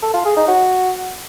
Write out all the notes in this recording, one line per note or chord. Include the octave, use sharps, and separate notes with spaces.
A4
F4
G#4
D#4
F#4